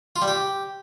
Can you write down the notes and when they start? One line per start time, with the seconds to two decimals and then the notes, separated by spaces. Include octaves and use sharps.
0.16 F4
0.22 G3
0.28 G4